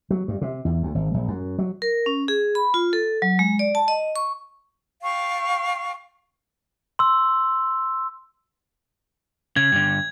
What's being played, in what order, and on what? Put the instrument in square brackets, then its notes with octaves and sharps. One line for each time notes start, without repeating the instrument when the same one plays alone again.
[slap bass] F#3
G2
C3
E2
D2
G#1
A#1
F#2
F#3
[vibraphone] A#4
C#4
G#4
B5
F4
A4
F#3
G#3
D5
A5
D#5
C#6
[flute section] F5 G5 C#6
[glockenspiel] C6 E6
[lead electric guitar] C#3 [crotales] G#6
[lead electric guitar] G2 D3